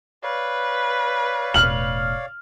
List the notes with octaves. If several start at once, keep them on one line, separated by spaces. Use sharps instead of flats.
B4 C#5 D5 F5
E1 A2 F6 F#7